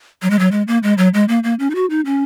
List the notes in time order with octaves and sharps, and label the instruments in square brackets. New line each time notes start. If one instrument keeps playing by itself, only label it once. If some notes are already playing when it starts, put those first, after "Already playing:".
[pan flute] F#3
G#3
F#3
G#3
A#3
G#3
F#3
G#3
A#3
A#3
C#4
D#4
F#4
D#4
C#4